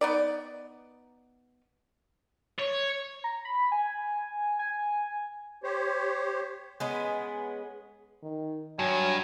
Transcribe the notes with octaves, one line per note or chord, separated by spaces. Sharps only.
B3 D#4 D5
C#5
A#5
B5
G#5
G#5
G4 C5 C#5
G#3 B3 C#4
D#3
G2 F#3 G#5